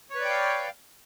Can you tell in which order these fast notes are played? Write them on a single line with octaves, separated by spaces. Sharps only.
C#5 B4 D5 G5 F5